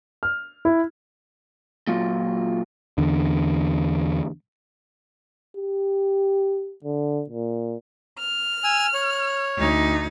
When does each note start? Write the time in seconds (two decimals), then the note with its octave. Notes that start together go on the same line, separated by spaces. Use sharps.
0.23 F6
0.65 E4
1.87 A#2 F#3 F4
2.98 E2 D3
5.57 G4
6.84 D3
7.29 A#2
8.19 F6
8.64 G#5 E6
8.94 C#5
9.57 D2 D#4